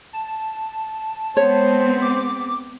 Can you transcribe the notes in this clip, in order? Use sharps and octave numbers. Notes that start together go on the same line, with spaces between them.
A5
G#3 B3 C4 C5 C#5
D6